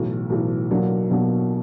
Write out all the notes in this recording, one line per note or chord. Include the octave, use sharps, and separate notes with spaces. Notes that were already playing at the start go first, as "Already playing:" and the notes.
Already playing: B1 A2 E3
B1 A2 E3
B1 B2 F#3 A#3 D4
B1 B2 F#3 A#3 D4